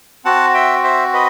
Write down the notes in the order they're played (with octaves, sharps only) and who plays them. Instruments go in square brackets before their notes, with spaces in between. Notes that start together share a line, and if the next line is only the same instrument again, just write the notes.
[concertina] C4 F#4 F#5 A5
E5 G5
C5 E5
B4 D#5